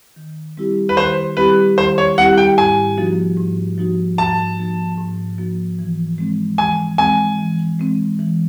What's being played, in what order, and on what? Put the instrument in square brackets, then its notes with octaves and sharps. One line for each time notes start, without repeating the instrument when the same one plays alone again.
[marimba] D#3
G3 C4 E4 G4
[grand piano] B4
[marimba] D#3 [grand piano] C5
[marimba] G3 C4 E4 G4 [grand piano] B4
[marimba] D#3 [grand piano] C5
[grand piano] C#5
[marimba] G3 C4 E4 G4 [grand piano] F#5
[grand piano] G5
[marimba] G#2 [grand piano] G#5
[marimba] F3 A#3 D#4 F#4
G#2
F3 A#3 D#4 F#4
[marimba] G#2 [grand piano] A5
[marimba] F3 A#3 D#4 F#4
G#2
F3 A#3 D#4 F#4
E3
G#3 C4
[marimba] E3 [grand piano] G#5
[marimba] G#3 C4 [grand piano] G#5
[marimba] E3
G#3 C4
E3